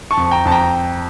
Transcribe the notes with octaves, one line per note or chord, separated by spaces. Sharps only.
A5 C#6
F2
G5 A#5
F2 A5
G5 A#5